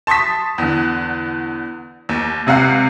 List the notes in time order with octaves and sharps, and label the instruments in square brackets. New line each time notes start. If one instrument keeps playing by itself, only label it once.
[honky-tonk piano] A5 C6 C#6 D#6 B6
E2 D3
D#2
C#2 C3 F5 F#5